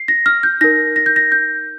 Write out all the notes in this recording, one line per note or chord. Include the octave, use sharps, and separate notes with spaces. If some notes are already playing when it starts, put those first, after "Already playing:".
Already playing: C7
A#6
F6
G6
D#4 A#4 A#6
A#6
G6
A#6
G6